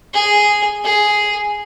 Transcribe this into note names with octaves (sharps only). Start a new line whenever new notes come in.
G#4
G#4